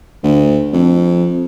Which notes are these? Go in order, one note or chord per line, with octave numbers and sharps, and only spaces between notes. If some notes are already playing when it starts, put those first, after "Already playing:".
D2
F2